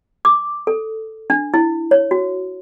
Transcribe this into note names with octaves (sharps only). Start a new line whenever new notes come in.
D6
A4
D4
E4
C#5
F#4